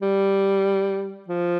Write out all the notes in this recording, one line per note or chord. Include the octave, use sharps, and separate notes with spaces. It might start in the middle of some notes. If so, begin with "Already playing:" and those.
G3
F3